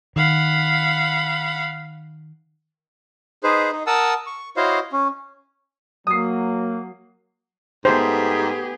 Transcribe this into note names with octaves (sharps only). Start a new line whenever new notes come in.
D#3 F5 F#5 B5
D#4 G#4 B4 C5
D#4
A#4 F#5 A5 D#6 E6
C#6
E4 F#4 C5 C#5 D#5 F5
C#4
F#3 A#3 D#6 C7
G#2 A3 B3 G4 G#4 C5